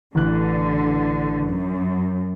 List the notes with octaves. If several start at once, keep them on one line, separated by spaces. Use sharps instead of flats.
A1 D3 E3 F#6
F#2